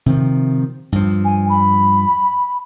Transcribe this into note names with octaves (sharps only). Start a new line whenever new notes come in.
C3 D#3 F3
G2 F3
G#5
B5